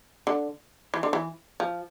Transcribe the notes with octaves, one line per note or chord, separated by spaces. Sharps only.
D3
E3
D3
E3
F3